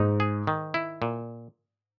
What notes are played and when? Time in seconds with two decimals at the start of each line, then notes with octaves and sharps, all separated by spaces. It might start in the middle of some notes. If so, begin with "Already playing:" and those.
Already playing: G#2 D#4
0.20 G#4
0.47 D#3
0.74 E4
1.02 A#2